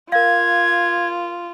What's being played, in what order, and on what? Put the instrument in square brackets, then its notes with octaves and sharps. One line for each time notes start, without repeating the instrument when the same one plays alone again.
[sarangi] F4 [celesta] A#4 F5 [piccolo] G#6